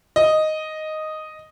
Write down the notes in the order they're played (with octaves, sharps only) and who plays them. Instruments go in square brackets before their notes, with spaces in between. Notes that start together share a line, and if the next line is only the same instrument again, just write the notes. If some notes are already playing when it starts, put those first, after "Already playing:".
[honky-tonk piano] D#5